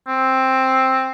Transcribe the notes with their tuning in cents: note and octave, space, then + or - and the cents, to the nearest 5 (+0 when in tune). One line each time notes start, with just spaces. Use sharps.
C4 +5